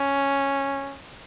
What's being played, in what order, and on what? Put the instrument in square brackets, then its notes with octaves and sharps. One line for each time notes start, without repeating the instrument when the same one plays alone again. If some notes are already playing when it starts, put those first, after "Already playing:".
Already playing: [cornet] C#4